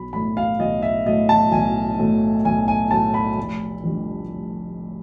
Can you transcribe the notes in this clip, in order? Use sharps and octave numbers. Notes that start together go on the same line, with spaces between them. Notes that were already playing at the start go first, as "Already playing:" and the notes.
Already playing: B1 B5
A2 F#3 A3 B5
F5
B1 D#5
E5
A2 F#3 A3 D#5
A5
B1 G#5
A2 F#3 A3
B1 G#5
G#5
A2 F#3 A3 A5
B5
F1
F2 D3 G3